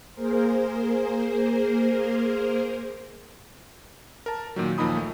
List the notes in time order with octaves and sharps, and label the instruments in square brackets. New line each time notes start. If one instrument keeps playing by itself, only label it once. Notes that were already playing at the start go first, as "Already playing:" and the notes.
[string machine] A#3 G#4 A#4 C5
[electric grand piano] A#4 A5
A#2 D#3 F#3
D#2 A#2 F3 D#4 B5 D#6
A3